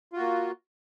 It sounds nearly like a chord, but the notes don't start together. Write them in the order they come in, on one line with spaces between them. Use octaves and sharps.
F4 F#4 A#3